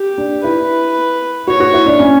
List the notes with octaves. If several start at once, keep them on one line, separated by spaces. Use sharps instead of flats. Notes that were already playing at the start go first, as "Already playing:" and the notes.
Already playing: G4
D4
E4 B4
F#4 C#5
F#4
E4
D4
C#4